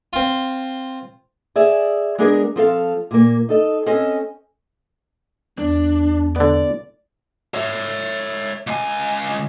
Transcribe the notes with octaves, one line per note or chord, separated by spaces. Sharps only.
C4 F4
G#4 D5 E5
G#3 B3 D4 G#4 A#4
F3 C4 A4 F5
A#2 A#3
D#4 A4 D#5
C4 C#4 A4 D#5 G#5
E2 D4
D3 B3 D5
C#5 E5
C#2 G#5